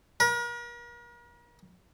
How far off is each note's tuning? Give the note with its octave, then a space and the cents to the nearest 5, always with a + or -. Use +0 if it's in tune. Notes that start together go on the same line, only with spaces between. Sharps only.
A#4 +40